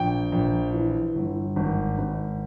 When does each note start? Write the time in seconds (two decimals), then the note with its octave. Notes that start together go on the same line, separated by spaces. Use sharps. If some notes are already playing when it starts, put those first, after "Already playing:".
Already playing: A#1 G5
0.32 A#1
0.73 E3
1.15 G1
1.56 G#1
1.98 G#1